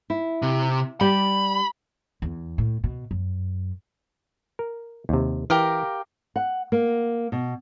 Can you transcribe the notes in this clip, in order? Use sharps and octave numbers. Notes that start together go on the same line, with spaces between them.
E4
C3
G3 G4 D5 B5
E2
A2
B2
F#2
A#4
D#2 C3
E3 G4 A#4 F5
F#5
A#3
B2